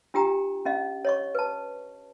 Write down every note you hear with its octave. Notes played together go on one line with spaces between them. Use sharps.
D4 F4 G4 G5 A#5
C#4 D#5 F5
C#5 D#5 C#6
B4 A5